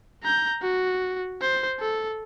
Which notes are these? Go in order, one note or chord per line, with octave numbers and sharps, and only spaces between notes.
A#5 G6
F#4
C5
A4